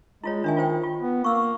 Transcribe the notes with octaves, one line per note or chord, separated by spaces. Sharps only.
G#3 E4 F4 C#5
D#3 D4 E5 G#5
F4 C5 G5
F4
B3
A#3 C#6 E6